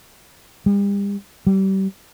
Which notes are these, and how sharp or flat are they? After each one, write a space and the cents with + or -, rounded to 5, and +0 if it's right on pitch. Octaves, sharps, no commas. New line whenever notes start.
G3 +40
G3 -30